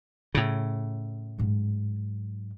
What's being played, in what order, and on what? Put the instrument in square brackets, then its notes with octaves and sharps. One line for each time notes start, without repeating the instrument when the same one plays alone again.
[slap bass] A2 C#3
[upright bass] G#2 F#3